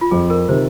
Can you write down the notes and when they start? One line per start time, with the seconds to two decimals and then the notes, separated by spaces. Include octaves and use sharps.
0.01 F4
0.11 F2 G#4
0.30 A#4
0.49 C3 D#3 C5